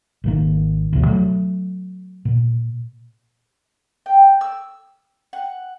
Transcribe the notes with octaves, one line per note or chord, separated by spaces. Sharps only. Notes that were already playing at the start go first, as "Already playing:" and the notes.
G#1 D#3 A#3
D2 B2 F3
F#3 A3
A#2
G5
E6
F#5